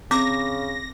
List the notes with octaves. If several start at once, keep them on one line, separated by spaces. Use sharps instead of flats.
C#3 C4 D6 A#6